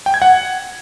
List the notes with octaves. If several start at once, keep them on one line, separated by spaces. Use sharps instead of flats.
G5
G#6
F#5